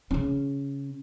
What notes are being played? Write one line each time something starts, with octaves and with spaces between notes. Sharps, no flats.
C#3 C#4